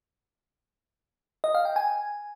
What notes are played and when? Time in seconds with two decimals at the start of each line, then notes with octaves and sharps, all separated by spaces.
1.44 D#5
1.55 F5
1.65 G5
1.76 G#5